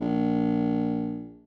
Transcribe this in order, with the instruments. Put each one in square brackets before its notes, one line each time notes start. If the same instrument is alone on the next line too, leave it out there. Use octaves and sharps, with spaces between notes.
[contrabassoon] A#1